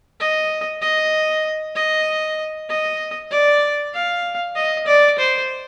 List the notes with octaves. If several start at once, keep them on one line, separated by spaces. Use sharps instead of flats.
D#5
D#5
D#5
D#5
D5
F5
D#5
D5
C5